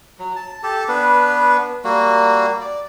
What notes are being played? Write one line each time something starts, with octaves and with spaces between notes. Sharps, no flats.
F#3
A5
G4 A4 A5
B3 D4 B4
G3 A#3 F#4
D5